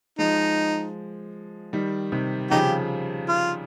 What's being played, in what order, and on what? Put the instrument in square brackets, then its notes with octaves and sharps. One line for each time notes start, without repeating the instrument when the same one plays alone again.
[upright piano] F3 G#3 [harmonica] D#4
[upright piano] D#3 G3
C3 D#3
[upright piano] C#3 F3 [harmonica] D#4 G4
[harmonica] F4